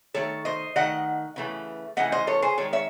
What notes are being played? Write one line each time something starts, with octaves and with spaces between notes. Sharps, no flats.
D#3 A3 A4 C#5
C5 D#5
D#3 A3 D#5 F#5
C#3 E3 A3
C#3 E3 A3 D#5 F#5
C5 D#5
A4 C#5
G#4 C5
D#3 G#3 A4 C#5
C#5 E5